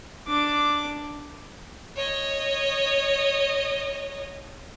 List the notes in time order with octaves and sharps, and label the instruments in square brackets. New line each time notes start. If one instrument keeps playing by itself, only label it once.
[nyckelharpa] D4 D6
[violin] C#5 D#5